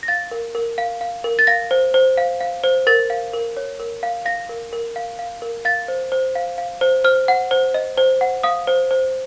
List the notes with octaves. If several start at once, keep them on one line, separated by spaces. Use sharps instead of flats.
A#6
F5 A6
A#4
A#4
F5
F5
A#4
A6
F5 A#6
C5
C5
F5
F5
C5
A#4 A6
F5
A#4
C#5
A#4
F5
F5 A#6
A#4
A#4
F5
F5
A#4
F5 A6
C5
C5
F5
F5
C5
C5 F6
F#5
C5
D#5
C5
F#5
F5 D#6
C5
C5